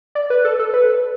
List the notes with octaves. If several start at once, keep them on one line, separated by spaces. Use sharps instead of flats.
D5
B4
A4
A4
B4